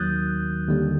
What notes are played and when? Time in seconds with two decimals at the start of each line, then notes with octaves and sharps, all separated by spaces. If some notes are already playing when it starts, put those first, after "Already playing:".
Already playing: D#2 D#3 F#3 D#6 F#6 G6 A6
0.68 D#2 D3 G3